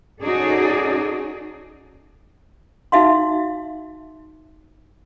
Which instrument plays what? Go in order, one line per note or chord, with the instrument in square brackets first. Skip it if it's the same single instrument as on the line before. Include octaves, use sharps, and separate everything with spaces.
[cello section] C#4 D#4 F#4 G#4 A4 D5
[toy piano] D#4 F#4 E5 F5 C6